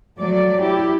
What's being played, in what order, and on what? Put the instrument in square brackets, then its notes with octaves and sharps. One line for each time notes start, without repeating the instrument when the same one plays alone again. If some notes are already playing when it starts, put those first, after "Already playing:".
[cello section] F#3 A3 D5
E4 G4